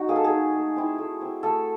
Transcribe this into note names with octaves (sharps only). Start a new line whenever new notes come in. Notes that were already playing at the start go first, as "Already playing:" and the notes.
Already playing: D#4 F#4
A#3 G#4
A4
G#4
D#4
A3
C4 E4
A3
C4 E4
A3 A4